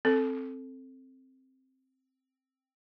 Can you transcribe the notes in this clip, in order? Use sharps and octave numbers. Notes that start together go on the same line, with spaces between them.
C4 A4